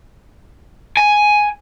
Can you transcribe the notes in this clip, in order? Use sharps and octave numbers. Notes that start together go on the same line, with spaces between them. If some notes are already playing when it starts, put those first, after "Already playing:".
G#5